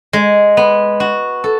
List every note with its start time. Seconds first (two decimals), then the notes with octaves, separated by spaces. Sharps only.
0.13 G#3
0.57 B3
1.00 F#4
1.44 A4